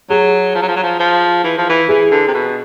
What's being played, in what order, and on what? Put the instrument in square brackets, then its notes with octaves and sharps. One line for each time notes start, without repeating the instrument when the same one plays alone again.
[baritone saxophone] F#3 [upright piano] G#4
[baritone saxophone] F3
F#3
F3
F#3
F3
F3
E3
F3
E3
[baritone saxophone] E3 [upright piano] G#4
[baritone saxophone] D3
C3
B2